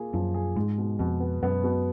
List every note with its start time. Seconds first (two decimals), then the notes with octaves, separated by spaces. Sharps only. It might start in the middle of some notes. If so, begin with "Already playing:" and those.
Already playing: A#3 F4 G#4
0.14 F#2 F3
0.34 G#4
0.56 G#2 G#3
0.78 B2
0.99 F2 B2
1.20 B3
1.43 F#2 B3
1.63 B2